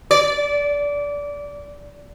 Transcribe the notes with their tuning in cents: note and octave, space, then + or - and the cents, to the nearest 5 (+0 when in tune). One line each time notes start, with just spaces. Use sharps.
D5 -20